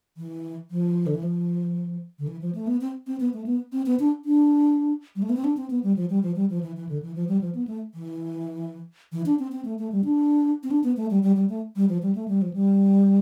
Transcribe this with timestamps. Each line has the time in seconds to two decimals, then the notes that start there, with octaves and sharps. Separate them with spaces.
0.17 E3
0.71 F3
1.07 D3
1.15 E3
1.23 F3
2.19 D3
2.28 E3
2.41 F3
2.55 A3
2.67 B3
2.81 C4
3.07 C4
3.20 B3
3.33 A3
3.46 B3
3.73 C4
3.86 B3
4.00 D4
4.25 D4
5.16 G3
5.22 A3
5.29 B3
5.37 C4
5.44 D4
5.57 C4
5.70 B3
5.83 G3
5.96 F3
6.10 G3
6.23 F3
6.36 G3
6.50 F3
6.63 E3
6.76 E3
6.89 D3
7.03 E3
7.15 F3
7.28 G3
7.41 F3
7.55 B3
7.68 A3
7.94 E3
9.12 E3
9.26 D4
9.39 C4
9.52 C4
9.65 A3
9.79 A3
9.92 G3
10.05 D4
10.63 C4
10.71 D4
10.84 B3
10.97 A3
11.10 G3
11.23 G3
11.36 G3
11.49 A3
11.76 G3
11.89 F3
12.02 G3
12.15 A3
12.28 G3
12.42 F3
12.54 G3